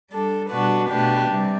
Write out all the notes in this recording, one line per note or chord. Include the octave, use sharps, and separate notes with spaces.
G3 D4 A4
B2 G3 D4 F#4 B4
B2 A3 D4 G4 B4
C3 G3